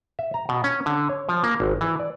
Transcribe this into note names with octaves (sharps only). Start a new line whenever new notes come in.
E5
A#5
B2
C#4
D3
C#5
F3
A#3
G#1
E3
D5